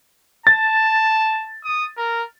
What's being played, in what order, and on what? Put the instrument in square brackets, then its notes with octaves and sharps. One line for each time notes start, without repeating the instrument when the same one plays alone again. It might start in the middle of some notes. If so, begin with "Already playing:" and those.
[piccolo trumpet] A5 [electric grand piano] A6
[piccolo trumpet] D#6
A#4